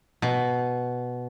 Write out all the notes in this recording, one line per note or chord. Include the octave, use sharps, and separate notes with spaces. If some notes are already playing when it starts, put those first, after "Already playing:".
B2